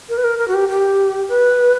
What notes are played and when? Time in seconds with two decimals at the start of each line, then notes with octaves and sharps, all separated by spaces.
0.09 A#4
0.18 B4
0.24 A#4
0.38 A#4
0.48 F#4
0.54 G4
0.69 G4
1.29 B4